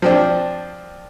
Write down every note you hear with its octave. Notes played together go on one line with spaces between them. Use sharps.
F3 C4 D4